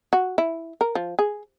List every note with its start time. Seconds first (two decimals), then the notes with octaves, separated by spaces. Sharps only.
0.13 F#4
0.38 E4
0.81 A#4
0.95 F3
1.19 G#4